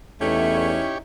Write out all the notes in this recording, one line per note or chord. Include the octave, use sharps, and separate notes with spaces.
E2 A3 C#4 D#4 E4 G4 C#5